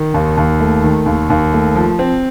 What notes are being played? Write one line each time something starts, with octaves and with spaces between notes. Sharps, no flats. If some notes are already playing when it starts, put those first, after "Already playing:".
Already playing: D#3
D#2
D#2
A3
D#3
D#2
D#2
A3
F3
C4